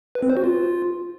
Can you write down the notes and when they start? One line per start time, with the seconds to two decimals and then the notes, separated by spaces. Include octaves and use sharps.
0.15 B4
0.22 C4
0.30 C5
0.37 F#4
0.44 F4